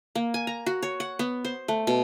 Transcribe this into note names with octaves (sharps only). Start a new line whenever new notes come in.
A#3
G#5
A#5
F#4
C#5
F#5
B3
C5
A3
B2